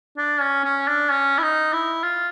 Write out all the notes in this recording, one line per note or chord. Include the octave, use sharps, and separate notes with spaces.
D4
C#4
C#4
D4
C#4
E4
D#4
E4
F4